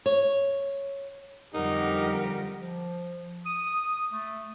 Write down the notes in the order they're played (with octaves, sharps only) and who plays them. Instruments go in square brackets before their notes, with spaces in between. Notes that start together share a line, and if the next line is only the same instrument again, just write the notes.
[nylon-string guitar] C#5
[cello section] F2 D3 G3 [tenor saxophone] D#4 [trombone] G4 [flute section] A#4 F#5
[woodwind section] F3
D#6
A3